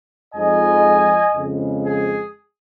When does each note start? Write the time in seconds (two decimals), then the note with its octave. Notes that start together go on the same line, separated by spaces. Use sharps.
0.34 F2 F3 G#3 D#4 D#5 G#5
1.35 F2 C#3 G#3
1.85 G#4